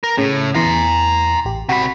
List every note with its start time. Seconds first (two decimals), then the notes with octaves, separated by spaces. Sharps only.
0.04 A#4
0.18 A2 C#3
0.55 E2 E3 A#5 C6
1.45 A1 G4
1.69 C3 F#4 B5